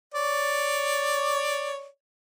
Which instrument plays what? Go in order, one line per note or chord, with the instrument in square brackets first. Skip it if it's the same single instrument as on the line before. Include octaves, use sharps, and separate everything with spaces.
[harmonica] C#5 D5